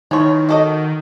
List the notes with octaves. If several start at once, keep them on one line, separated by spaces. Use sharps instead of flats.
D#3 E3 D#4 C#5 C6
F#4 A4 D#5